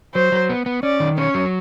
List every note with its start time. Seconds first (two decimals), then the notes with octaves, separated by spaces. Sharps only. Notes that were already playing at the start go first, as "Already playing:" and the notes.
0.15 F#3 C5
0.32 F#3
0.49 B3
0.66 B3
0.83 C#4 D5
1.00 D#3
1.18 C#4 C#5
1.34 F#3